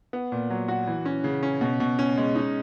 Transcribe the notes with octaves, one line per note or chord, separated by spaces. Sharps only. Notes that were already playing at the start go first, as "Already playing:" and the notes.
B3
A#2
F#3
F#4
E3
C#4
C#3
C#4
B2
B2
C#4
G#3
D#4